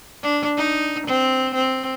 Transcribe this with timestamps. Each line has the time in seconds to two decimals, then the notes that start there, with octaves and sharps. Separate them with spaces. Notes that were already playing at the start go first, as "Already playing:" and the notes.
0.22 D4
0.57 D#4
1.07 C4
1.54 C4